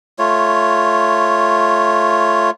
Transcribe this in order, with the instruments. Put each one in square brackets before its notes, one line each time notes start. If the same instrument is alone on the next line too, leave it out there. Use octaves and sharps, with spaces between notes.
[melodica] A3 F4 C#5